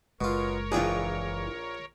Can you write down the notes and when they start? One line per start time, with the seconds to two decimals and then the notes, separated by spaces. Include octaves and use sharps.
0.21 F#1 B2 G#3 F4 A#4 C#5
0.72 A#1 E3 D4 F4 G#4 G5